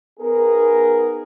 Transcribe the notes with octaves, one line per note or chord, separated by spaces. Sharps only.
B3 D#4 G#4 A#4